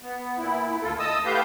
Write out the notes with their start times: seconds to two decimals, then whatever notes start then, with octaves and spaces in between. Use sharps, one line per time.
0.02 B3
0.38 A#2 E4
0.82 D2 F4 A4
0.99 D#5 A5 D#6 E6
1.25 A3 B3 G4 B4 F5 G6